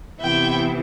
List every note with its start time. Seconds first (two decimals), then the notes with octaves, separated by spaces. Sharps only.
0.20 C3 E3 B3 E4 E5 G5